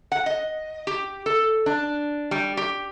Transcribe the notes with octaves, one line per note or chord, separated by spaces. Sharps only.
F#5
D#5
G4
A4
D4
G3
G4